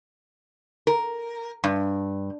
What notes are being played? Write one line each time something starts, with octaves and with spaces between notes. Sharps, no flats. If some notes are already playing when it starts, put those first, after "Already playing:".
A#4
G2